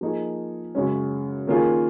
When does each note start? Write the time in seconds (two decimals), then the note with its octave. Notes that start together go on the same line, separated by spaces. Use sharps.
0.01 F3 A#3 D#4 G#4
0.75 F#2 C#3 G#3 C#4
1.47 D#3 A#3 C#4 F4 G#4